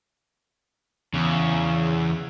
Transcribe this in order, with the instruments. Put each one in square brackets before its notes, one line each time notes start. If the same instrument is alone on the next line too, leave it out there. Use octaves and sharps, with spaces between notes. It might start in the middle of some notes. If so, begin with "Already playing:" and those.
[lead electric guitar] E2 [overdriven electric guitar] C#3